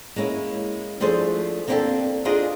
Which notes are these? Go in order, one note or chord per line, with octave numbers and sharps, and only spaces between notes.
G#3 A#3 C#4 E4
F3 A3 D4 G#4 C5
A#3 C4 D4 D#4 G4 A4
D4 D#4 F4 G#4 D#5